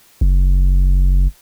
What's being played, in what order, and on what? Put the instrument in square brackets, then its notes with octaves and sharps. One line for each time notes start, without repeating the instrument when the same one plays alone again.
[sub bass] F#1